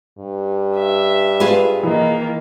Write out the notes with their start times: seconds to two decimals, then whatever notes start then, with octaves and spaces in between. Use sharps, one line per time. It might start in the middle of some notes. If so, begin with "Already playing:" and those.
0.18 G2
0.78 E5
1.40 F4 G#4 B4
1.83 D#3 E3 A#3 E4 D#5